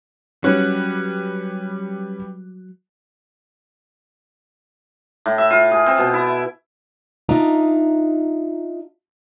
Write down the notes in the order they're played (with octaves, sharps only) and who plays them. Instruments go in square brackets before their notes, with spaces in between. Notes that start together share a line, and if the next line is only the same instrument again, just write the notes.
[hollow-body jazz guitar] F#3 [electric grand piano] G3 B4 F#6 [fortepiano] C#4
[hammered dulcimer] A2
E5
F4
G#4
C4
B2
E4
[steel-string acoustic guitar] D4 D#4 F4 D#5 E5 A#5